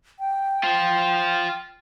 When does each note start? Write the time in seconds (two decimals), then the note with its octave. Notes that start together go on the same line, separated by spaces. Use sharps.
0.19 G5
0.63 F4 C5